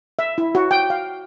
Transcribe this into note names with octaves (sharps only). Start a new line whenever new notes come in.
E5
E4
F#4
G5
F5